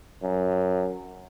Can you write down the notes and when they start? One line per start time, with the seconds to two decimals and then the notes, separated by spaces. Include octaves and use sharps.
0.23 F#2